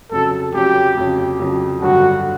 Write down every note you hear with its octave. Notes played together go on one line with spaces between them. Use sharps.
F2 C#3 F#3 A4
F2 C#3 F#3 G4
F2 C#3 F#3
F2 C#3 F#3
G2 D3 F#3 F#4